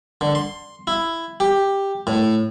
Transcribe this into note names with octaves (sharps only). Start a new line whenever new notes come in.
D3
C6
E4
G4
A2